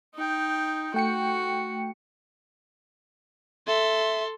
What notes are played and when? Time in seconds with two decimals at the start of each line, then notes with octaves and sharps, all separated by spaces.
0.15 D#4 G5
0.94 A3 F#4 G5 C#7
3.67 A4 E5 C6